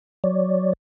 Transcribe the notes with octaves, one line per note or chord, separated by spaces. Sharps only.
F#3 C#5 D5